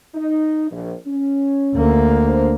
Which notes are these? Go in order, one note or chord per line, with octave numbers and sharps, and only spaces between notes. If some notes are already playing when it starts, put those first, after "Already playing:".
D#4
A#1
C#4
D2 A#3
D4 C5